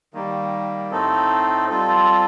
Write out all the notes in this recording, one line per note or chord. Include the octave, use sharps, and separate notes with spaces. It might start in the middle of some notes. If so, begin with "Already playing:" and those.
D#3 G3 A#3
A2 A3 C4 D#4 A4
G3 C4 F4 A4